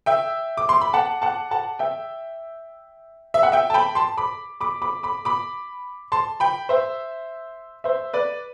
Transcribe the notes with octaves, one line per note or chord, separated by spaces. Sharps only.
E5 G5
D6
C6
B5
F#5 A5
F#5 A5
F#5 A5
E5 G5
E5
F#5
E5 G5
A5
G5 B5
A5 C6
B5 D6
B5 D6
B5 D6
B5 D6
B5 D6
A5 C6
G5 B5
C5 E5
C5 E5
B4 D5